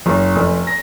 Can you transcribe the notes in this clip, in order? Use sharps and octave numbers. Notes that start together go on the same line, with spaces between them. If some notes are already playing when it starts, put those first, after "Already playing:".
F#1
F1
A#6